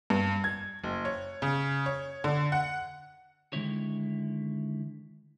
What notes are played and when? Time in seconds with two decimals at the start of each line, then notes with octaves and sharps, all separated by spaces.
0.10 G2
0.44 G#6
0.84 F#1
1.05 C#5
1.42 C#3
1.86 C#5
2.24 D3
2.52 F#5
3.53 D3 D#3 G#3 A#3 E4 C#5